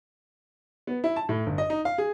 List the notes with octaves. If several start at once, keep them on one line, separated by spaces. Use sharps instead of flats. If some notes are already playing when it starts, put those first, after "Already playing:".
B3
E4
A5
A2
G1
D#5
D#4
F5
G#4